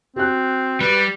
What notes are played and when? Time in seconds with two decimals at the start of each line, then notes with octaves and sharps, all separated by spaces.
0.16 C4 F#4 F#6
0.80 G3 B4